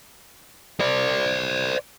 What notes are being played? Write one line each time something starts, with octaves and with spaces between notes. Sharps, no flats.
C5 D5